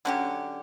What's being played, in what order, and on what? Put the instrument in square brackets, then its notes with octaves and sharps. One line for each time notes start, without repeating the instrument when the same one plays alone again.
[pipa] D3 F#3 C#4 G4